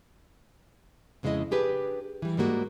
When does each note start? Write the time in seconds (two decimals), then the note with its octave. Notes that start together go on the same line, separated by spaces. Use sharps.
1.23 F2 C#3 G#3 A3 E4 D#5
1.51 D4 G4 G#4 B4
2.22 E3 G3
2.37 G#2 G3 G#3 A#3 F#4